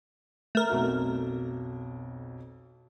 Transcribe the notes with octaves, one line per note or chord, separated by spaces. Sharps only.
A3 A#4
B1 F2 F#4